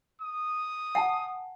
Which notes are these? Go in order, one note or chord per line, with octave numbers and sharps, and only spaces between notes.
D#6
F#5 G#5 A5